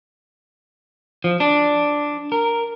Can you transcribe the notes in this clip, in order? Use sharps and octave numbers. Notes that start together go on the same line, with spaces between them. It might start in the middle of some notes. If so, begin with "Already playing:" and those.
F3
D4
A#4